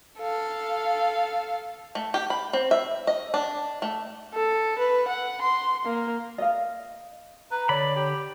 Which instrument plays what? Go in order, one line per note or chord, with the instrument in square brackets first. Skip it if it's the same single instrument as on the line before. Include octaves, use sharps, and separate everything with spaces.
[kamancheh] A4 F5
[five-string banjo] A3
G4
B5
C4
E5
D#5
D4
A3
[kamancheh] A4
B4
F#5
C6
A#3
[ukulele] D#5 F5
[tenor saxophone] B4 [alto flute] A#5
[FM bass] D3 [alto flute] C#5 [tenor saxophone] D5 [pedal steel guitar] B5
[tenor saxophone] G4